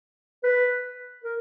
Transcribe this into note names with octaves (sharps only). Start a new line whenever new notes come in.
B4
A#4